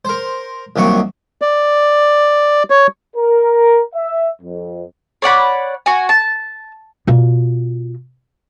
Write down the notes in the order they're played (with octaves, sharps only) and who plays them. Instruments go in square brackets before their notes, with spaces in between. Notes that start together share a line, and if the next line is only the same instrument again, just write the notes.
[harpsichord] A#4 C5
C2 D#3 F#3 A#3 C#6
[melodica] D5
C#5
[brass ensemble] A#4
E5
F2
[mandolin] C#5 D5 F#5 B5
F#4 G#5
A5
[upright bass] B2 F4